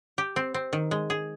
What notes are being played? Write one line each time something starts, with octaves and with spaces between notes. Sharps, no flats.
G4
C4
C4
D#3
G#3
G#4